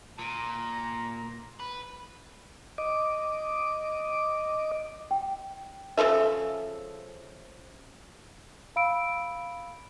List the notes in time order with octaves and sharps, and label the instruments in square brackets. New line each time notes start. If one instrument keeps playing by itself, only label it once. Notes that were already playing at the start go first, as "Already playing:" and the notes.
[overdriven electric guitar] A#2 [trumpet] A#5
[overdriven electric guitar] B4
[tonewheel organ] D#5 D6
[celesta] G5
[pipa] C#3 F3 A4 E5
[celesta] F5 B5 E6 D7